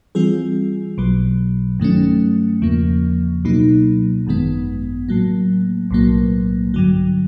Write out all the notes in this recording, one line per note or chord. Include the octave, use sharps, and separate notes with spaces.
E3 G3 C4 F4 G#4
B1 B2 F#3
G2 D#3 F#3 A3 C#4
E2 C#3 F3 A#3
C#2 B2 F#3 A#3 D#4
G#1 F#2 D#3 G#3 B3
A2 F#3 A#3
B1 A2 F#3 A#3
G2 D3 F#3